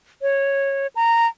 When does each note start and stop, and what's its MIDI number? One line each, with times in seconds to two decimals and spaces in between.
0.22 0.87 73
0.96 1.27 82